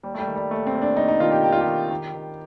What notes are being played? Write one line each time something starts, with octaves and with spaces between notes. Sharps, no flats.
D#2 G3
A3
G3
D#3
G3
D#2 A3
C4
D#2
D4
D#2 D#4
D#4
D#3 F4
G4
D#3 G4
F4
G4
D#3
D#3
D#3